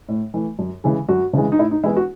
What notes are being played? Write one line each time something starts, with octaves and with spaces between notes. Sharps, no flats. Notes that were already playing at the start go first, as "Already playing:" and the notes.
A2
E3 A3
F#2
C#3 E3 G#3
F#2 F#4
C#3 E3 G#3
D#4
A2 E4
D#4
E3 G#3 B3 E4
F#4